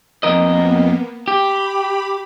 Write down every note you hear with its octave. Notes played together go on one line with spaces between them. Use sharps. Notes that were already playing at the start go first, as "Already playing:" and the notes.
F2 A#3 B3 A#4 D#5
G4 B5